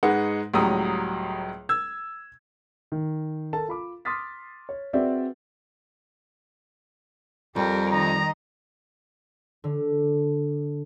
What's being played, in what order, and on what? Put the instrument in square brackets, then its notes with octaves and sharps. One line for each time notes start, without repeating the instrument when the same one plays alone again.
[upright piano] G#2 G#3 D#4 B4 F#5
C#2 A2 F#3 G3 A#5 D#6
E6 G#6
[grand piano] D#3
A4 A#4 A5
F4 B5 D6
C6 D6 D#6 F6 A6 B6
C#5
C4 F#4 G#4 B4 D5 E5
[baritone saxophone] F2 [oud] G3 [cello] G4 A#4
[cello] D#3 D#5 [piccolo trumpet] A#5
[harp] D3